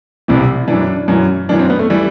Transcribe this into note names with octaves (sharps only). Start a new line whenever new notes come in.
C2 C3 E3
F#2 E3 D4
F#2 E3
F#2 E3 D4
C4
B3
A3
E3 G3